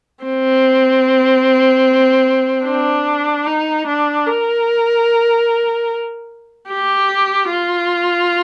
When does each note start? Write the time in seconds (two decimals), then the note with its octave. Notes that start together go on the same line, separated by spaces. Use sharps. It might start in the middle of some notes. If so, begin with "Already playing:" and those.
0.24 C4
2.66 D4
3.46 D#4
3.87 D4
4.27 A#4
6.69 G4
7.50 F4